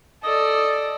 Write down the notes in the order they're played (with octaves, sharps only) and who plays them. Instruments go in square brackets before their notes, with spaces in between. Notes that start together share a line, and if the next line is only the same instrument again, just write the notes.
[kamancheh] A4 D5 [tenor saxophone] D#5